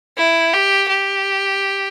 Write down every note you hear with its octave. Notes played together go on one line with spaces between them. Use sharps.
E4
G4
G4